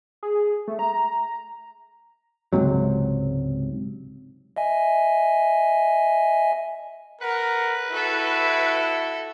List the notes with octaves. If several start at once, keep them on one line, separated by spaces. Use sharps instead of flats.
G#4
A3
A#5
C#2 G#2 C3 F#3
D#5 E5 G#5
A#4 B4 F#5
E4 F#4 A4